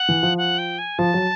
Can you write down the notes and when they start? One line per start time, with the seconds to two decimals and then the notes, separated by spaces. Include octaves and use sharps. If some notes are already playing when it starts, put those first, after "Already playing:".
Already playing: F#5
0.09 E3
0.23 F3
0.38 F#5
0.58 G5
0.79 G#5
0.99 F3 A5
1.14 F#3